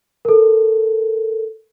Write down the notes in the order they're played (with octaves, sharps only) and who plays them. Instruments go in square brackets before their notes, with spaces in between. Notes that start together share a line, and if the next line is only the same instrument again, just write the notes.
[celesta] A4 A#4